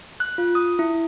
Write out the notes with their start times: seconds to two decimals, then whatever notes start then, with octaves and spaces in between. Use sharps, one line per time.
0.20 F#6
0.38 F4
0.55 D#6
0.79 E4